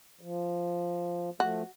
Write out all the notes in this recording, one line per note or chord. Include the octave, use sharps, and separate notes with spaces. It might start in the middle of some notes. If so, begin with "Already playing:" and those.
F3
F3 A3 F#4